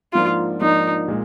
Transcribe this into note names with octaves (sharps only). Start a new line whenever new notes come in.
G#2 F3 A#3 D4 F4
G#2 F3 A#3 D4 D#4
A#2 G#3